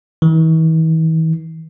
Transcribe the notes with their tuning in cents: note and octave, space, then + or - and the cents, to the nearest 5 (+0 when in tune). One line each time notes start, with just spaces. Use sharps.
E3 -45